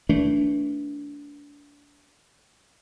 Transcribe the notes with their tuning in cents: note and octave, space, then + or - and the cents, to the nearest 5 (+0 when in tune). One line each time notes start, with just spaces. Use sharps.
E3 -25 A3 +0 D4 -25